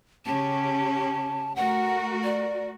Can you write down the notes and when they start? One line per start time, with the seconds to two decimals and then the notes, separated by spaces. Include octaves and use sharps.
0.26 C#3 C#4 G4 A5
1.56 A3 F#4 A#4 F#5
2.24 D5